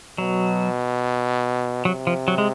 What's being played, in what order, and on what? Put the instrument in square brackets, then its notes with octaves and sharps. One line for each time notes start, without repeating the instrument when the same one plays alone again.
[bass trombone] B2 [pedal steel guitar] F#3
[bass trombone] C3 [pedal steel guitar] F#3
[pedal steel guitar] F3
F#3
G#3